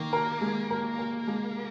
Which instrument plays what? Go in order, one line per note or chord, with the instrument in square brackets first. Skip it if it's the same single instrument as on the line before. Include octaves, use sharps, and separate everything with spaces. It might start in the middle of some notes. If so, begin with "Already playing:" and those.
Already playing: [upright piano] D#3 [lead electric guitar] A#3
[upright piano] A#4
G#3
A#4
A#4
G#3